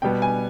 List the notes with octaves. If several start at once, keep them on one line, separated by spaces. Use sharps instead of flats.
B2 G3 B3 G5
G#5